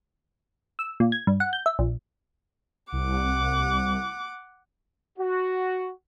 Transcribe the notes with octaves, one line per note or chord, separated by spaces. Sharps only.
E6
A#2
G#6
G2
F#5
G6
E5
A#1
C2 F#5 D6
F#4